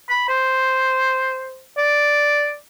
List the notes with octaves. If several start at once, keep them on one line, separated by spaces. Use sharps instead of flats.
B5
C5
D5